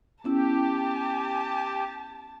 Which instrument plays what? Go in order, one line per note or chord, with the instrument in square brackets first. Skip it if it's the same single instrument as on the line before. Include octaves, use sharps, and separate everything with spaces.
[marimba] B3 C#4 E4 [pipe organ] G4 [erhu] A5